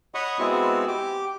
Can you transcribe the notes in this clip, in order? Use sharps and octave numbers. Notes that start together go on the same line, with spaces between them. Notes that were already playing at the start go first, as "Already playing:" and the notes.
C#5 D#5 F#5 B5 C#6 D#6
G#3 B3 C4 E4 F#4
G4 D6